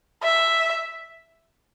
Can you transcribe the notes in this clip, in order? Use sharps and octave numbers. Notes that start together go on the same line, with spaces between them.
E5